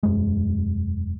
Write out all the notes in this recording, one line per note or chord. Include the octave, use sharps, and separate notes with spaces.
E1 F#2 G#3